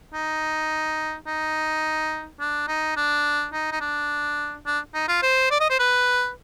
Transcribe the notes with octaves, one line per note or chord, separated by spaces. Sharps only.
D#4
D#4
D4
D#4
D4
D#4
D#4
D4
D4
D#4
F4
C5
D5
D#5
C5
B4